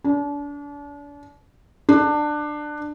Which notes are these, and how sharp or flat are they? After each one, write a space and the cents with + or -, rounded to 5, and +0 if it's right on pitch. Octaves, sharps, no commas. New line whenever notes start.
D4 -35
D4 +20